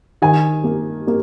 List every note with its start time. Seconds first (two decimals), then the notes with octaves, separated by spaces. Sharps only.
0.22 D#3 G#5
0.64 A#3
1.07 A#3